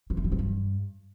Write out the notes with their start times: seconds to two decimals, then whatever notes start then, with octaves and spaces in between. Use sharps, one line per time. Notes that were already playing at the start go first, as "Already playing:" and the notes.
0.10 F#3
0.17 E3
0.24 F#3
0.32 G3
0.39 G2